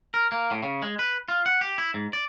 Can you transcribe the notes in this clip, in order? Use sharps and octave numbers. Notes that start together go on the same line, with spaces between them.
A#4
A#3
A2
C#3
G#3
B4
F4
F#5
G4
E4
G#2
D5